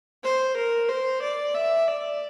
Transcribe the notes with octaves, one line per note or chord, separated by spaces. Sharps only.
C5
A#4
C5
D5
E5
D5